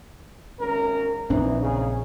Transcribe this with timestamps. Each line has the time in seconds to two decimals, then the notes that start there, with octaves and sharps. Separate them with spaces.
0.60 G#1 C#4 A#4
1.30 A#1 E3 C4 D4 D#4
1.62 C#3 D#4 G#4